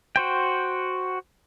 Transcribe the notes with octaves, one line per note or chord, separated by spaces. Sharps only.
F#4 C5 G5